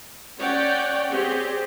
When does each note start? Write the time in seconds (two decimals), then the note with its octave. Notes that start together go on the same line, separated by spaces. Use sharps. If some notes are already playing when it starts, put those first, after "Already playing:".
0.38 C#4 C#5 D5 F#5 G5
1.10 C4 G4 G#4